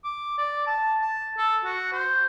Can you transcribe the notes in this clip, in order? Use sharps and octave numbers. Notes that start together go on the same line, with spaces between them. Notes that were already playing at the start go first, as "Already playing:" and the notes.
D6
D5
A5
A5
A4
F#4
C5